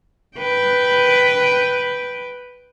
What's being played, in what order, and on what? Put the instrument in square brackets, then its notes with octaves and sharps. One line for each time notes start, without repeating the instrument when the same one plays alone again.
[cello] B4 G5